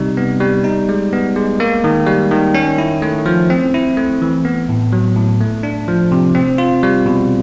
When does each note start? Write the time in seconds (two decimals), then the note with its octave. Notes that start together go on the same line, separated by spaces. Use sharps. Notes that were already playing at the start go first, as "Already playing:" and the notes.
Already playing: C3 G3 D#4
0.17 B3
0.40 G3
0.64 D#4
0.89 G#3
1.13 B3
1.36 G#3
1.60 A#3
1.84 D#3
2.07 G3
2.31 D#3
2.54 C#4
2.78 E4
3.02 A3
3.26 F3
3.50 C4
3.74 E4
3.97 A3
4.22 E3
4.45 B3
4.69 A2
4.93 F#3
5.16 A2
5.41 A3
5.63 D4
5.88 F3
6.12 C3
6.35 C4
6.58 F4
6.83 G3
7.06 B2